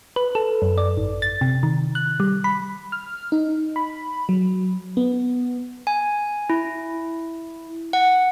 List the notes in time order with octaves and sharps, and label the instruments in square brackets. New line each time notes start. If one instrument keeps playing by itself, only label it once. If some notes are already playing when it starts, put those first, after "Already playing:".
[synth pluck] B4
A4
F#2
D5
G#1
A6
C3
D#3
F#6
G3
B5
[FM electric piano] F6
D#4
B5
F#3
B3
[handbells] G#5
E4
F#5